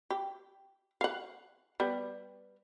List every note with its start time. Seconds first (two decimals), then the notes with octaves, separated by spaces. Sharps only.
0.10 G4
1.01 F5 F#5
1.80 G3 B3